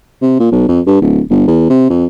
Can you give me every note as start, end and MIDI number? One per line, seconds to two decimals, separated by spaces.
0.22 0.39 48
0.39 0.47 46
0.52 0.66 35
0.68 0.80 41
0.87 1.00 43
1.01 1.21 26
1.30 1.47 31
1.48 1.69 40
1.70 1.90 48
1.90 2.05 41